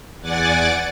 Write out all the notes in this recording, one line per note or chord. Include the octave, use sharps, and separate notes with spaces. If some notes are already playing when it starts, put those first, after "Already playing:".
E2 D5 F#5 G#5 D6 A6